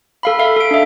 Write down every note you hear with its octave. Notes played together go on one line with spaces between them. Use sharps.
A4 F5 B5
E5 F5
A4 D7
D4 E5